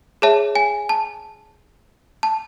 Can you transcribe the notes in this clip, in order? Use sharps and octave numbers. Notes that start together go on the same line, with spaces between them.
G#4 C#5 E5 A5
G#5
A5
A5